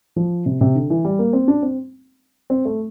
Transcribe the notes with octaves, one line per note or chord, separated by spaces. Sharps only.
F3
C3
C3
D3
E3
G3
A#3
C4
D4
C4
C4
A3